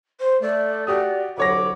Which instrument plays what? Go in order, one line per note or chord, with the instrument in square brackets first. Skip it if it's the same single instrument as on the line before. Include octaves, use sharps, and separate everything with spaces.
[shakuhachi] C5
[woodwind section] A3 [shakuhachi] D5
[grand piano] F#4 G4 D#6 [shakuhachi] D5
[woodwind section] C2 D3 D6 [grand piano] F#3 C#5 A#6 [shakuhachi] B5